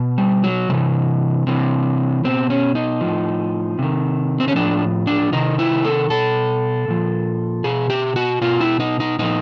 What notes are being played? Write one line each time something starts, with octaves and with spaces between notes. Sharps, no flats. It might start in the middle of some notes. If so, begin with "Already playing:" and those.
Already playing: B2
G3
F#3
C3 E3 G3
C3 E3
B2 C4
C#4
D#4
A2 F3
C3 D#3
C4
C#4
A2 F3 D4
D4
C3 D#3 D#4
E4
A4
B2 A4
A#2 F3
B2 G#4
G4
F#4
B2 F4
E4
D#4
D#4
A#2 F3 D#4